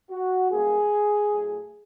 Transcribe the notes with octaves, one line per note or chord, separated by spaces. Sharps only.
F#4
F#2 D#3 G3 A#3 G#4
A2 F#3 A3